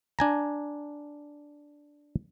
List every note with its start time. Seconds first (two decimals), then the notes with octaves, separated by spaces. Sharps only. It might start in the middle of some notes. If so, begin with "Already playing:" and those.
0.19 D4 G#5 A#5